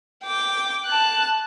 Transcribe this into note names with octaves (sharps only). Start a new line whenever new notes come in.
G5 D6
A5 F#6